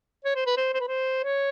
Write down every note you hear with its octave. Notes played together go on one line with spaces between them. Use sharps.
C#5
C5
B4
C5
C5
B4
C5
C#5